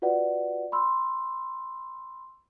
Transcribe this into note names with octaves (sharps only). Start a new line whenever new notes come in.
F4 F#4 B4 D5 F#5
B5 C6 E6